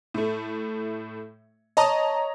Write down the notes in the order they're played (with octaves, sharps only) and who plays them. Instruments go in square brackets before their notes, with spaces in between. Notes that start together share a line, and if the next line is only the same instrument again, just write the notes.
[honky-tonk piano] A2 A3
[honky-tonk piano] C#5 A#5 D#6 [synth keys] D#5 A5